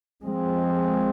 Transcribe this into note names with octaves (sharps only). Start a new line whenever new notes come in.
F3 G#3 C4